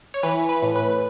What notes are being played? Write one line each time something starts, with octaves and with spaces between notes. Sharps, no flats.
C#5
E3 B4
B4
A2
B4